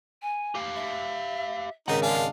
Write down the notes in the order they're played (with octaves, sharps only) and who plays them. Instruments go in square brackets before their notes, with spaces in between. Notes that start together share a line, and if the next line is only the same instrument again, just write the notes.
[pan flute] G#5
[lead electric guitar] G4 F5
[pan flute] E5
[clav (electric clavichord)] G#1 C#3 [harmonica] D#4 [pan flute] A#4 [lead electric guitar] D#5 F#5
[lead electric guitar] D3 G#5 [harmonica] G#3 D4 F5